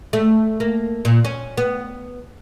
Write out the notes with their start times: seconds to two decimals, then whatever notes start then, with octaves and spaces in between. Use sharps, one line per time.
0.13 A3
0.60 A#3
1.05 A#2
1.25 C#4
1.58 B3